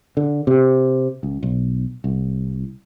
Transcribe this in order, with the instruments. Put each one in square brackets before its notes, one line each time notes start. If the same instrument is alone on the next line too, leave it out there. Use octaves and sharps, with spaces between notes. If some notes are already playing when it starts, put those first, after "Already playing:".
[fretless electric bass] D3
C3
C#2
B1
C2